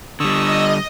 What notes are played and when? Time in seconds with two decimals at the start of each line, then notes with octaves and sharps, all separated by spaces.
0.20 D3 G3 D#5 C#6 D#6 E6